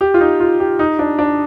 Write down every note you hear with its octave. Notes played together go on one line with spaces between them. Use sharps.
G4
F4
D#4
F4
G4
D#4
D4
D4